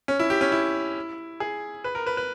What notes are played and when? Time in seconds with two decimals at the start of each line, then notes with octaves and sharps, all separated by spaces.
0.08 C#4
0.19 E4
0.30 G4
0.41 C#4
0.52 E4
1.40 G#4
1.84 B4
1.95 A#4
2.07 B4
2.17 B4